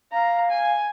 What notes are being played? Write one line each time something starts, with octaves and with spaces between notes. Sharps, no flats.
F5 A#5
G#5